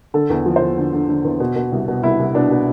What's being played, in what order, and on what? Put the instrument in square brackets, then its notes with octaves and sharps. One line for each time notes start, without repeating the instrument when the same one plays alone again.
[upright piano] D3 A4
E2
F3
C5
E2
D3
D3
D3
E2
B2
B2
C2
B2
C2 E4
C2
B2 D4
B2